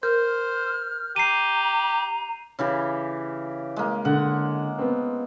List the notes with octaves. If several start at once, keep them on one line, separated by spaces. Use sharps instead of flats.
A#4 C5 F6 G6
G4 A#5 C7 D#7
C#3 E3 G4
G#3 A#3
D3 F#5
B3 C4